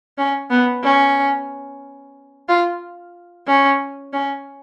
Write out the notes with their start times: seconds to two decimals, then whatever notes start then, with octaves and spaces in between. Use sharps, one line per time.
0.18 C#4
0.50 B3
0.83 C#4
2.49 F4
3.47 C#4
4.13 C#4